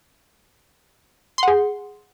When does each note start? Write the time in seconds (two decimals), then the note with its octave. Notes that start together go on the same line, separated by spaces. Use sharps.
1.38 C6
1.43 F#5
1.48 G#4